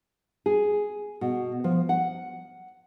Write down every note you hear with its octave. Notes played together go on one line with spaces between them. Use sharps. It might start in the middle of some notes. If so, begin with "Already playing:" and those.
G#4
B2
F3
F#5